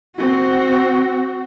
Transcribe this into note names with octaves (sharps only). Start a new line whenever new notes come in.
C4 F#4